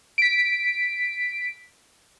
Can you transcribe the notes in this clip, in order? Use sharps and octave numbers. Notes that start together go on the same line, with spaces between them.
B6 D7